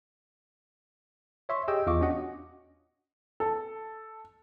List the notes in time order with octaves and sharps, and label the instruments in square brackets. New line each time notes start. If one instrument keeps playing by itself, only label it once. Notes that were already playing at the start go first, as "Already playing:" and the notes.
[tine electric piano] C#5 E5 C6 C#6
G4 G#4 D#5 G5 E6
E2 F4 D#5 F5 C#6 D6
C#4 D4 F#4 D#5 F#5
[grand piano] A4